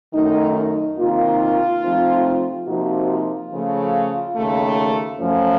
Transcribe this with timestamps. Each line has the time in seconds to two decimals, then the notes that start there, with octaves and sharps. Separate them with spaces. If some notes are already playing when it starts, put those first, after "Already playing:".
0.13 F#2 D#3 A3 D#4
0.55 D#4
0.97 C3 D#3 A#3 D#4 F4
1.82 C3 F3 A3 C4 D#4
2.66 C3 F3 A#3 D#4 F#4
3.09 F4
3.51 C#3 F3 A3
4.35 D#2 C#3 A3
5.19 F#2 F3 A3 C#4